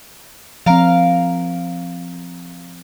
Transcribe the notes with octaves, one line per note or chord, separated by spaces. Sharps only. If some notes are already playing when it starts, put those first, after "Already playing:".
F3 C4 A#4 F5